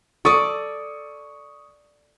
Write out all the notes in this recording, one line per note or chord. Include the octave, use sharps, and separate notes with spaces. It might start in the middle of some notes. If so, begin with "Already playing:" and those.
A4 D5 C#6 D#6